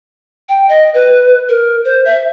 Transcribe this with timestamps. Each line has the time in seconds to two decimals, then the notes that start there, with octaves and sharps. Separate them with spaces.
0.49 G5
0.69 D#5
0.94 B4
1.49 A#4
1.85 C5
2.05 E5